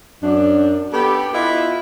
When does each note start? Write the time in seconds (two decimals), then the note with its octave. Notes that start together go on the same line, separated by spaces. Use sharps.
0.22 F#2 D4
0.92 B3 G4 A4
1.33 B3 E4 F4 B4 D#5 E5